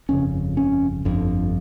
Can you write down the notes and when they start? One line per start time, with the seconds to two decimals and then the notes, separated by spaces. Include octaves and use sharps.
0.09 G1 F2 C#3 C#4
0.57 C#4
1.05 G1 F2 D3